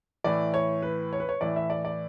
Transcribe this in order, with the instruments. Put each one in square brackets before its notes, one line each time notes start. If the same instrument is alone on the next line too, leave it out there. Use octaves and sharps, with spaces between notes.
[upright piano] A2 E3 D5
C#5
B4
C#5
B4
C#5
A2 E3 D5
E5
D5
D5